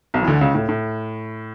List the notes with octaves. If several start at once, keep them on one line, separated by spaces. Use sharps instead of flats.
B1 B2
E3
D2 D3
C#2 C#3
A2
A2